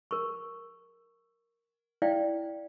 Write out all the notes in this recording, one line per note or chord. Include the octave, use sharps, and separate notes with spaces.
A#4 C#6
E4 D5 F5 G5